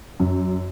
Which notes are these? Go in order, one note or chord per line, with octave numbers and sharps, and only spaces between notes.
F#2